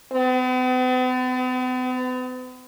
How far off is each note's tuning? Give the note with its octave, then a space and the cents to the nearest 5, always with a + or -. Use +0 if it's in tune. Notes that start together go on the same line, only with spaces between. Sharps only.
B3 +45